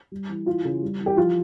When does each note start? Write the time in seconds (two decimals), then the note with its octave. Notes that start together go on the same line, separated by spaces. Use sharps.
0.12 G3
0.29 E3
0.46 E3 F4
0.65 C#3
0.83 G3
1.00 E3
1.06 G4
1.17 F3 F4